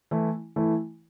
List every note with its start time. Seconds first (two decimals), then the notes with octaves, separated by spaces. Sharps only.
0.11 E3 A3 E4
0.56 E3 A3 E4